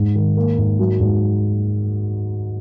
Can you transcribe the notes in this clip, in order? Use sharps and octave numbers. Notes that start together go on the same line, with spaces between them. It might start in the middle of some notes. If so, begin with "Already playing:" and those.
Already playing: G#2
D#3
A#3
G#2
F#3
G#2